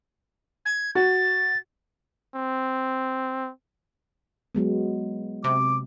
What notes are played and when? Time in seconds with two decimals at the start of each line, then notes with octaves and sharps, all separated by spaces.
0.66 G#6
0.95 F#4 A6
2.35 C4
4.55 F#3 G#3 B3
5.44 C3 D6